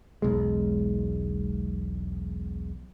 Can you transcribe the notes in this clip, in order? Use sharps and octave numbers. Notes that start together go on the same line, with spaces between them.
E1 B1 G#3